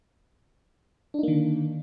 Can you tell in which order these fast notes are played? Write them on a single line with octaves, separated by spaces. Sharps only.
D4 D#4 A#3 D#3 D3